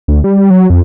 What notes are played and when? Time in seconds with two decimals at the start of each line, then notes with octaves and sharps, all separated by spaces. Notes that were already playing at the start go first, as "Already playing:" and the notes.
0.08 D2
0.24 G3
0.50 F#3
0.70 F2